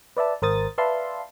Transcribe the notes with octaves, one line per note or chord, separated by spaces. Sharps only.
B4 D5 E5 A5
G#1 A#4 C5 D#6 A6
B4 D5 E5 F5 A5 C6